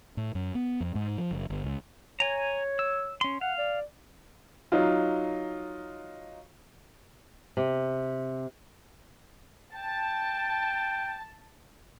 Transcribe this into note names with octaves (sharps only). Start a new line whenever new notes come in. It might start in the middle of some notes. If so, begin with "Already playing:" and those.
A2
F#2
B3
F2
G#2
F3
F#1
G1
C#2
C#5 G#5 A#5
E6
C#4 C6
F5 F#5
D5
F#3 D#4 F4
C3
G5 A5